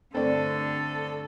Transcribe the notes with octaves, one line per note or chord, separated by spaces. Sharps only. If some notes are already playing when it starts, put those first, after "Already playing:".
G2 D3 A3 C4 A4 D5